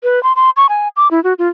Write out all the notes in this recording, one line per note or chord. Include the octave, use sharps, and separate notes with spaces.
B4
C6
C6
C#6
G#5
D6
E4
F#4
F4